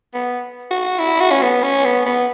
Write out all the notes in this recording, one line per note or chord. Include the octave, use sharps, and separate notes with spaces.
B3
F#4
E4
F#4
C#4
B3
C#4
B3
B3